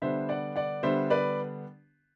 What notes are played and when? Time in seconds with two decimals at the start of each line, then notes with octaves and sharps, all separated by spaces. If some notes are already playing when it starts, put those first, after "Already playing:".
0.02 D3 G3 B3 D4 C5 E5
0.29 D5 F#5
0.56 D5 F#5
0.83 D3 G3 B3 D4 C5 E5
1.10 B4 D5